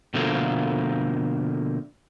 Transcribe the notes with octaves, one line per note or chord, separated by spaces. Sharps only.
B2 D3 F3 A3 A#3